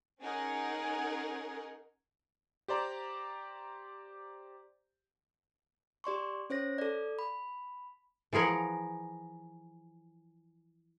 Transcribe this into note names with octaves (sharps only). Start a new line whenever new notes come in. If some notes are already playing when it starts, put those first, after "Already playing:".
C#4 D#4 G#4 A#4 F#5
G4 C5 D5 A#5
G4 D5 C6 C#6
C#4 C5 C#5 A#6
A4 D5
B5
E3 F3 G#4 A#4 F#5